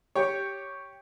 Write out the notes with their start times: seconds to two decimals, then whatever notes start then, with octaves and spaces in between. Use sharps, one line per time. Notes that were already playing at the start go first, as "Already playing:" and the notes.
0.15 G4 C#5